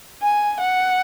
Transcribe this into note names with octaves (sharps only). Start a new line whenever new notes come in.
G#5
F#5